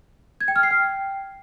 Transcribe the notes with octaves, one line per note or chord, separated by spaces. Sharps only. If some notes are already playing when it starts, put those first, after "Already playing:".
G#6
G5
F6
C7
G5